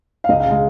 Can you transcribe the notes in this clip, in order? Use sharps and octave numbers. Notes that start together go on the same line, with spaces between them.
F5
C#2 D#5
F5
C#3
G#3 F5